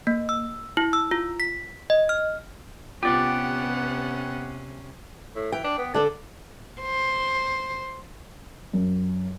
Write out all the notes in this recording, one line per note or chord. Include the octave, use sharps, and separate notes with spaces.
A#3
E6
E4
E6
F4
B6
D#5
F6
C3 B3 C#4 F4 G4 D5 F#5
A2
E3 G5
D4
B3
D3 D4 A4
C5
F#2